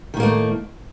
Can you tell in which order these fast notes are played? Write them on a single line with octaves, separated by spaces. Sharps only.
D#3 A2 A#3 A3